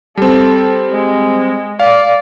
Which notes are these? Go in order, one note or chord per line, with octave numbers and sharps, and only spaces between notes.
G3 C4 A4
G#3
D5 F5